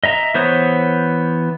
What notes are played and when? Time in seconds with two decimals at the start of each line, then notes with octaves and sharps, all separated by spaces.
0.04 D#5 E5 A#5
0.34 E3 B3 C5 C#5 D#6